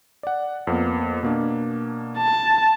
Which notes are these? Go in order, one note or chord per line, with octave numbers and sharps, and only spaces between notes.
D5 F#5
F2 A#3 B3
B2 A#3 D4
A5